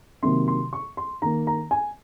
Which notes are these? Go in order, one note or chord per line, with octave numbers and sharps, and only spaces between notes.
C3 D#3 F#3 A#3 C6
C6
C#6
C6
D#3 A#3 A#5
A#5
G#5